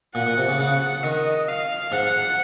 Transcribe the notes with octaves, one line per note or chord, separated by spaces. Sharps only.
A#2 F#5
A#2
C3
C#3
C#3 F#5
D#3 D#5
F5
G#2 F#5